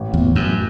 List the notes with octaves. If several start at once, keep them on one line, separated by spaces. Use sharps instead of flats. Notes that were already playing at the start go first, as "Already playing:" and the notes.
Already playing: A1
E2
A1
F#2